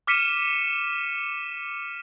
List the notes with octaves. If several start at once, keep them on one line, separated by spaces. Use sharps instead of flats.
D6 F6 B6 C#7 D#7 E7